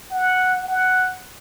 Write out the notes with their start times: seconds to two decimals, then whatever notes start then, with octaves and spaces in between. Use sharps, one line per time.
0.11 F#5
0.68 F#5